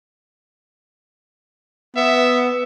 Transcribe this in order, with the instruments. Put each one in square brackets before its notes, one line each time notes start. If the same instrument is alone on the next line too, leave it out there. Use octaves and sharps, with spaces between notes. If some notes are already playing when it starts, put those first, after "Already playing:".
[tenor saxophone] B3 [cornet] E5